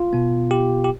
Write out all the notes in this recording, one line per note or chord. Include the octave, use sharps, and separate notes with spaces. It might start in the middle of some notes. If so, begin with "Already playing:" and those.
Already playing: F4
B2 B3
G4
G4